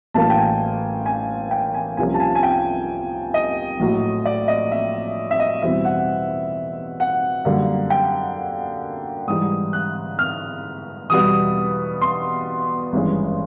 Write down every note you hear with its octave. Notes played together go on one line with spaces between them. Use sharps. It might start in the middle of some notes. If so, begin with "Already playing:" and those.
A1 A2 F#3 A#3 A5
G5
G#5
G#5
G5
G#5
C2 C3 F3 A#3 C#4 G#5
A5
G#5
G#5
G5
D#5
A#1 A2 F#3
D5
D#5
E5
E5
D#5
E2 B2 G3 C4 E4 E5
F#5
F#5
F#2 D3 G3 A#3
G5
G#2 E3 G3 D#6
F#6
F6
E2 B2 G3 B3 D#6
C6
G#1 G2 E3 G#3 C#4